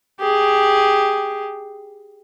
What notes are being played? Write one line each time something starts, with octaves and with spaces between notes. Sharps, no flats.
G4 G#4